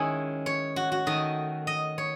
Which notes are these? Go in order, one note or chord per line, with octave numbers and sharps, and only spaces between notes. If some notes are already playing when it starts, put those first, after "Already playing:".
Already playing: D#3 G#3 C#4 E4 D#5
C#5
F#4
F#4
D#3 A3 D#4 D#5
D#5
C#5